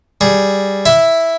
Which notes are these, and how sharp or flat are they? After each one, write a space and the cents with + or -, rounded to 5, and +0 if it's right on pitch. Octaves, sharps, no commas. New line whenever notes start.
G3 +0 G#4 +0
E4 +0 E5 +0